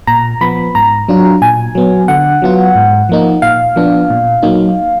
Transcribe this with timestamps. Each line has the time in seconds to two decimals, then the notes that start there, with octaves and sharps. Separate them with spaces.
0.07 A#2 A#5
0.41 F3 B3 B5
0.75 G#2 A#5
1.08 F#3 D4 F4
1.42 A#2 G#5
1.75 F#3 B3
2.08 D3 F#5
2.42 F#3 B3 F4
2.75 G#2
3.09 F3 A#3 D#4
3.42 A#2 F5
3.76 F3 B3 D4
4.10 A#2
4.43 F#3 A#3 D#4